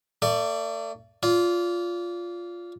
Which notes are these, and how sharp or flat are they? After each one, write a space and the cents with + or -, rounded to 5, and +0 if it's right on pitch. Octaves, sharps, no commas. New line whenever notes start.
A3 +40 D5 +0
F4 +0 D5 -30